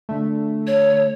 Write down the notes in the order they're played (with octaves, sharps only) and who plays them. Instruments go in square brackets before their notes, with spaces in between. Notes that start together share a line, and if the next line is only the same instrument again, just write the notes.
[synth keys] D3 A3
[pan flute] C#5